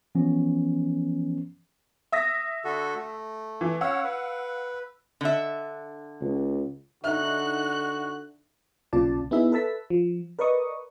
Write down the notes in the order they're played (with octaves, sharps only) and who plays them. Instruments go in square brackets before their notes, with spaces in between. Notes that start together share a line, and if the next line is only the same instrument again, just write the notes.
[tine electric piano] E3 F3 B3 C#4
[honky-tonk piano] E5 D#6 A#6
[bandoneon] D3 F#4 A4
A3
[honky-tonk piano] E3
[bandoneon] C#4 C#5 [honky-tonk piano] F5 F#5 E6
[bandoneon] B4
[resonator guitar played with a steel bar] D3 E5
[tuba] C#2
[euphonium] D3 [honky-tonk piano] D#4 E5 [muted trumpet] F#4 [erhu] F#6
[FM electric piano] B1 A#2 C#3 F4 D5 A5
B3 D#4 E4 G#4 E5
A4 B4 E5 A5 B6
F3
A#4 B4 D5 D#5 C#6 D#6